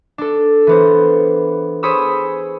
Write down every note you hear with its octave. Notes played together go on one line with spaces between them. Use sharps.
D4 A4
E3 B3 C5
G#4 C5 C#5 B5 D#6 E6